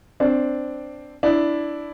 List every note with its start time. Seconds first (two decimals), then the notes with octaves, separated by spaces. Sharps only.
0.20 C4 D4
1.23 D4 E4